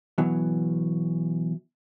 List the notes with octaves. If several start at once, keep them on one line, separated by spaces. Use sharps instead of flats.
B2 E3 F#3